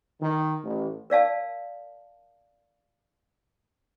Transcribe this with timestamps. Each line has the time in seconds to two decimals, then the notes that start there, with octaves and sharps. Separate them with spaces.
0.22 D#3
0.64 A1
1.10 A#4 D5 F5 A5